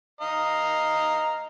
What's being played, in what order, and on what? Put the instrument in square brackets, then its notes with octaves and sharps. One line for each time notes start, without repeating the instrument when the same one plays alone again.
[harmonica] D#5 F5 A#5